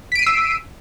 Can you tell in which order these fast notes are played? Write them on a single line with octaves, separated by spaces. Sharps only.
B6 D7 D#7 C7 E6